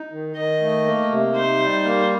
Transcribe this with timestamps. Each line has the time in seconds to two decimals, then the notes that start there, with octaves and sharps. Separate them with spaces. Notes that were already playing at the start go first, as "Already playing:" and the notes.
Already playing: D#4
0.12 D#3
0.37 D#3 D#5
0.61 A3
0.86 A#3
1.10 C3
1.35 D#4 C5
1.59 G3
1.84 A#3